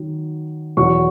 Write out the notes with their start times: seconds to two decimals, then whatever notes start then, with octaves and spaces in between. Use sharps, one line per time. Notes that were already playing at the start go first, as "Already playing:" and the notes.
Already playing: D#3 F#3
0.77 E2 B2 F#3 C#6